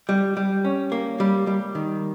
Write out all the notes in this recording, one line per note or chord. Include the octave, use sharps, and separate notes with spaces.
G3
G3
C#4
A#3
G3
G3
D#3